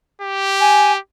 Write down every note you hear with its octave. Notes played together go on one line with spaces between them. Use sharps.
G4
G#5